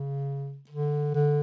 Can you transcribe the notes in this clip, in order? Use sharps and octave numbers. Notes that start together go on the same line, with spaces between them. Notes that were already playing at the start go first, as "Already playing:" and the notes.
Already playing: C#3
D3
D3